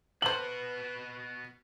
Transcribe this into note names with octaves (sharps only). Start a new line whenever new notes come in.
B3 F#4 A4 B4 C5 F#7